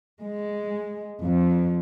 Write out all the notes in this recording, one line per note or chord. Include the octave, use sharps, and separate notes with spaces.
G#3
F2